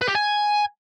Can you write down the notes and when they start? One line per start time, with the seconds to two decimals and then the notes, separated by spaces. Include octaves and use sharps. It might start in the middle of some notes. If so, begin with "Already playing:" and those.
0.01 B4
0.08 G4
0.15 G#5